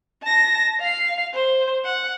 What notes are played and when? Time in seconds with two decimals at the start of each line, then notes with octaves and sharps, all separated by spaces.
0.23 A5 A#6
0.80 F5 C7
1.33 C5
1.85 F#5